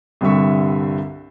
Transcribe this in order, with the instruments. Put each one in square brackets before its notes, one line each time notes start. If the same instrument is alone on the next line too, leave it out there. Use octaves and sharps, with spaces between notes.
[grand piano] C2 G2 D3 G3 E5 C#6